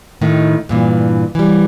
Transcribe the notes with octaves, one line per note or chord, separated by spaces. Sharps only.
A2 D#3 D#4
G2 A#2 E3
E3 G3